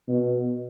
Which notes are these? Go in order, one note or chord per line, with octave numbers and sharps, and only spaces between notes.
B2